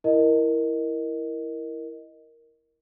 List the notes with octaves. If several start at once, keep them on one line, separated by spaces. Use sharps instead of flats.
E4 A#4 D#5